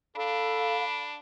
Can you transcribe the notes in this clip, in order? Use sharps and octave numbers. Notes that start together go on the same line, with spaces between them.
D4 A4 F5 B5